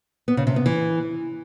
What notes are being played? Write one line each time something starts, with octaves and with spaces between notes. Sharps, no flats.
B3
C#3
C3
B3
E3